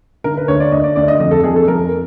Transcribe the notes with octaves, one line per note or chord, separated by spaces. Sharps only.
D3 A#4
B4
D2 C#5
D5
D2 D#5
D5
D2 D5
D#5
F2 D#5
A4
F2 G#4
A4
F2 A#4